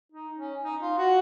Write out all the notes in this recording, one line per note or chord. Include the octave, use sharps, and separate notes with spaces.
D#4
C#4
D#4
F4
F#4